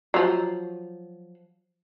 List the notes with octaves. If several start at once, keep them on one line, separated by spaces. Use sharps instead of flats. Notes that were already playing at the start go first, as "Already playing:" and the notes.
F3 F#3